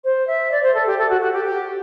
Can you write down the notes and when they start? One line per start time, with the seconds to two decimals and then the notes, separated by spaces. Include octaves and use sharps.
0.04 C5
0.27 E5
0.52 D5
0.63 C5
0.74 A4
0.86 G4
0.99 A4
1.09 F#4
1.21 F#4
1.33 G4
1.45 G4